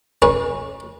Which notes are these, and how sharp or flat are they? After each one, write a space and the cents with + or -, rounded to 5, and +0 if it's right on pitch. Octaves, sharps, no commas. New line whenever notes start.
C#4 -15 B4 -45